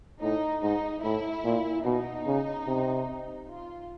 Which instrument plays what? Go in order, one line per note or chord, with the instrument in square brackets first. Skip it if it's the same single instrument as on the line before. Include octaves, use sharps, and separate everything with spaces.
[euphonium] A2 [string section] D#4
[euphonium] G#2 [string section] D#4
[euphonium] A2 [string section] E4
[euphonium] A#2
[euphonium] B2 [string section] D#4
[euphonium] C#3
C3
[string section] F4